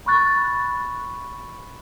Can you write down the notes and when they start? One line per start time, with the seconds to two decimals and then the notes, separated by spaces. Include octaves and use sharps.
0.06 B5 C#6 F#6 A6